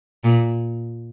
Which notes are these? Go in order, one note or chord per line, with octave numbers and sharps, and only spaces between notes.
A#2